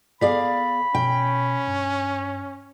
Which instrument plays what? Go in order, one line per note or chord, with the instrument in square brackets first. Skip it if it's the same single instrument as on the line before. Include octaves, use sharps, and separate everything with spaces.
[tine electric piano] B3 B6 [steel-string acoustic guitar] G#4 D5 F5 [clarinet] B5
[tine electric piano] B2 [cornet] C#4 [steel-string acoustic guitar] G5
[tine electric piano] G2